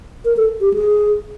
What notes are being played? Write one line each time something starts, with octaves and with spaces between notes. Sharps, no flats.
A#4
A4
G4
G#4